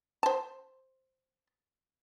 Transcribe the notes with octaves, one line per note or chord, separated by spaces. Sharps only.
C5 A5